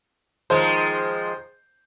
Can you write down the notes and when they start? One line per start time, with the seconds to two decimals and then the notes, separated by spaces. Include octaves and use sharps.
0.50 D#3 F3 G#3 C5